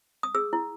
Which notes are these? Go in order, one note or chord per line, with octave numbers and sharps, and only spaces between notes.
D#6
G#4 E6
E4